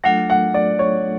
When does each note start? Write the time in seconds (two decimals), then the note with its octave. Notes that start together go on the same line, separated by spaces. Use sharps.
0.04 F#3 A3 D4 F4 A4 F#5
0.30 F#5
0.54 D5
0.79 C#5